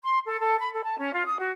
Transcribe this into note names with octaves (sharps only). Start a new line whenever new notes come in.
C6
A4
A4
B5
A4
A5
C#4
F4
D#6
F#4